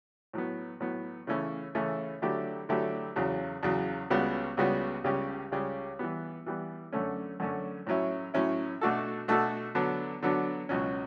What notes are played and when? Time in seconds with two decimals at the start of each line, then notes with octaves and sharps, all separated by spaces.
0.33 A2 F#3 B3
0.80 A2 F#3 B3
1.27 C#3 E3 A3 C#4 E4
1.75 C#3 E3 A3 C#4 E4
2.22 D3 F#3 A3 E4 G4
2.69 D3 F#3 A3 E4 G4
3.16 E2 C#3 F#3
3.63 E2 C#3 F#3
4.10 C#2 C#3 G3 B3 F#4
4.57 C#2 C#3 G3 B3 F#4
5.04 C#2 C#3 G3 C#4 G4
5.51 C#2 C#3 G3 C#4 G4
5.99 E3 G3 B3
6.46 E3 G3 B3
6.93 F#2 D3 A3 C#4
7.40 F#2 D3 A3 C#4
7.87 A2 F#3 C#4 E4
8.34 A2 F#3 C#4 E4
8.81 B2 A3 D4 F#4 A4
9.28 B2 A3 D4 F#4 A4
9.75 D3 F#3 B3 D4
10.23 D3 F#3 B3 D4
10.69 C#2 B2 F#3 C#4